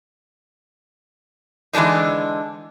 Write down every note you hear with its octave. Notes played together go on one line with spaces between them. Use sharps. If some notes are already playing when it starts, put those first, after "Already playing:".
D3 E3 G#3 D4 D#4